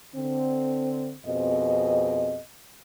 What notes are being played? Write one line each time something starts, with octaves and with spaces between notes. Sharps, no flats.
D3 C4
F2 B2 C4 G#4 D#5